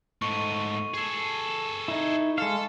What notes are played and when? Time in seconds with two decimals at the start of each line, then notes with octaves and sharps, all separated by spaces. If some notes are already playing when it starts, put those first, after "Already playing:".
0.22 G#2 A3 C#6
0.94 G#4 A4
1.88 D#4 E4
2.38 G#3 A4 F5